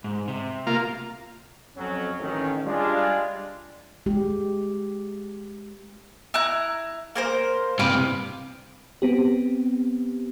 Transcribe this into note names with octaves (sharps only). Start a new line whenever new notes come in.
G#2
C3
A#3 F4
F2 F#3 C#4
A1 D#3 C#4
G3 G#3 D4 F4
G#3 G4
E4 A#5 F#6
A#3 A#4 C5
G2 C3 B4 F5 D6
B3 C4 G4